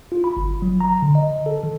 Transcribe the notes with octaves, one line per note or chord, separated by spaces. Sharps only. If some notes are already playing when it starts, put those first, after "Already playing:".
F4
B5
G1
F#3
A#5
D3
D#5
A4
D#3